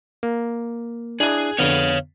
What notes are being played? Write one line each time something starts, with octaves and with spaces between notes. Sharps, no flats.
A#3
D4 E4 G#4 F#6
F2 D3 B3 C#5 F5